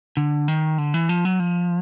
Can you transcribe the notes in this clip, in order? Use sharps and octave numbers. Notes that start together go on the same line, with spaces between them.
D3
D#3
D3
E3
F3
F#3
F3